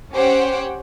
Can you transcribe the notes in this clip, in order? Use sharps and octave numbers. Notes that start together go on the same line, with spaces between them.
C#4 G4 C5 C#5 F#5 G5